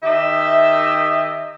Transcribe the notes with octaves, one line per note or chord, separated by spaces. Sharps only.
D#3 G4 D#5 E5